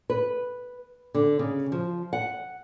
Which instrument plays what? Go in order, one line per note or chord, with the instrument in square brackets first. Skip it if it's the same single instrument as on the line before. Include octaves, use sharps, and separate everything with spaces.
[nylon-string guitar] B4
D3
C#3
F3
F#5